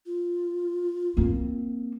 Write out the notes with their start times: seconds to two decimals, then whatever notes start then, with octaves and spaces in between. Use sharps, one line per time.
0.06 F4
1.17 A#3 C4